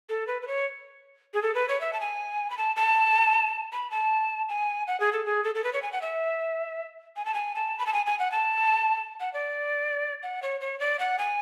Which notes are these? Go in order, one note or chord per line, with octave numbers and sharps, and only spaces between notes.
A4
B4
B4
C#5
G#4
A4
B4
C#5
E5
A5
G#5
B5
A5
A5
B5
A5
G#5
F#5
G#4
A4
G#4
A4
A4
B4
C#5
G#5
F#5
E5
G#5
A5
G#5
A5
B5
A5
G#5
G#5
F#5
A5
F#5
D5
F#5
C#5
C#5
D5
F#5
G#5